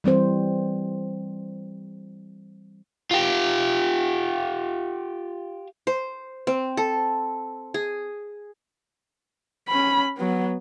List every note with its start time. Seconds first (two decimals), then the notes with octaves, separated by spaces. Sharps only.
0.04 E3 G3 C4 C5
3.11 F4 G4
5.87 C5
6.47 C4
6.77 A4
7.74 G#4
9.69 C#4 B5
10.17 F#3 B3